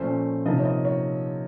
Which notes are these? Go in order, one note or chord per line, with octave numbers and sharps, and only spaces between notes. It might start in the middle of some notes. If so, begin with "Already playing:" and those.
Already playing: A#2 F3 A3 C#4 C5
C3 F3 A#3 D#4 D#5
C#5
D#5
C#5